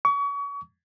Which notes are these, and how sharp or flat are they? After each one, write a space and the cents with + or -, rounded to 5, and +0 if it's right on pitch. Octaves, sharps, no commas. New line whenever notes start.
C#6 +35